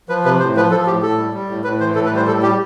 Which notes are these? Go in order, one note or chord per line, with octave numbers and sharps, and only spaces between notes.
F3 B4
C3 B4
A2 C5
F3 B4
F3 A4
A2 G4
A2 A4
G3
G3
A2
A2 B4
E3 C5
A2 A4
B4
G3
C5
A2 A4
G3 G4